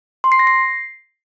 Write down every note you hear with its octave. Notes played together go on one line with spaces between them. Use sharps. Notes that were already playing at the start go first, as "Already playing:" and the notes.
C6
C7
A#6
C7